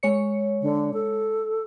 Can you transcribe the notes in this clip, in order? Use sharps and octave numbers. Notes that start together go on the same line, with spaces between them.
G#3 C#5 C#7
D3
A4